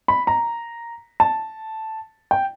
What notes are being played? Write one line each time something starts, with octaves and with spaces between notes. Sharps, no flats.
B5
A#5
A5
G5